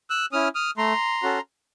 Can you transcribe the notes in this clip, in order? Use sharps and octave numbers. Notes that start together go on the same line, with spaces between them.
E6 F#6
C#4 E4 D#6 F6
D#6 F6
A3 A#5 C6
C#4 F#4 A4